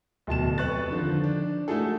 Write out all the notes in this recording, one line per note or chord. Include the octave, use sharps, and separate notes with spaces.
D1 B2 A5 E7
F1 B4 C#6 F#6 A6
D3 D#3 F3
D4
A3 D#4 E4 F#4 G#4 A4